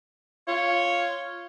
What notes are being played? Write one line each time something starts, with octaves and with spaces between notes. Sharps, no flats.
F4 C#5